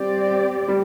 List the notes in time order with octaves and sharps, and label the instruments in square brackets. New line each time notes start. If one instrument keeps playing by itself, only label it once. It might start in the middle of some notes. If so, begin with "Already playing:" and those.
Already playing: [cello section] G3 C4 G4 D5
[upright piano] G3